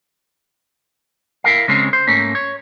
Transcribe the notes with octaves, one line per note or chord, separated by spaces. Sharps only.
E4 A#4 F5
C#3 G#3 C4 C#4
C5
G#2 A3 A#3 C#4
C#5